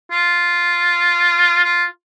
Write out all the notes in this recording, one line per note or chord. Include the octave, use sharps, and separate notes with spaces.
F4
F4